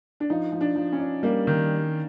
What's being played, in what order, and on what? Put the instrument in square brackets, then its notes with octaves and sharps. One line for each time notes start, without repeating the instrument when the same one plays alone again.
[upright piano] D4
[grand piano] F3 [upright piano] D#4
[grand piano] F3
[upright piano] D4
[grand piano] F3
[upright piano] C#4
[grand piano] D4
[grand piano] G3 [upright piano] A#3
[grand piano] D#3